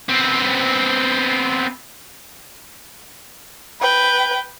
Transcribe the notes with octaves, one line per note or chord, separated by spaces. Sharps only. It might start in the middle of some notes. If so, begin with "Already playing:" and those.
B3 C4
B4 G5